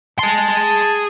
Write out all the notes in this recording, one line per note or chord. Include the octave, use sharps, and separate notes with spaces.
G#4 A5 C6